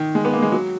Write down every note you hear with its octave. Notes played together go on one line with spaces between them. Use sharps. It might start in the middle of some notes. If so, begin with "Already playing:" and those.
Already playing: D#3
G#3
B3
A#3
G#3
F#3